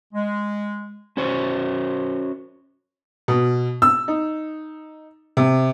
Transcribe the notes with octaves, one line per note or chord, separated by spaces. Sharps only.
G#3
C#4 F#4 C5 C#5
B2
E6
D#4
C3